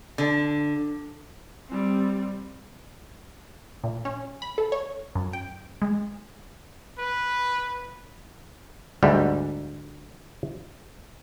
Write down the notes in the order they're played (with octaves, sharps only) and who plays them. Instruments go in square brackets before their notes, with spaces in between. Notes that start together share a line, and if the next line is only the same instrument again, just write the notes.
[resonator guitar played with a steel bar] D3
[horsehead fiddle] G3 C4
[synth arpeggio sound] A#2
C#4
B5
A4
C#5
F#2
G5
G#3
[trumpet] B4
[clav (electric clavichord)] D2 G#2 D3 G3